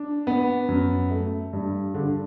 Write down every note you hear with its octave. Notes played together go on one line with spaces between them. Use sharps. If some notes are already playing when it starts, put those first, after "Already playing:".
Already playing: D4
B3
F#2
A3
G2
D3